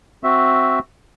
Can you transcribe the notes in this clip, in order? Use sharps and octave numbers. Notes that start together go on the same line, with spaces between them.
C4 F#4 E5